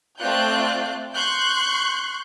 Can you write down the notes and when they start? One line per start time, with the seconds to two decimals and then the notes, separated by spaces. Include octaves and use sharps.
0.18 A3 C4 F4 D5 F#6 G6
1.15 C6 C#6 F#6 G6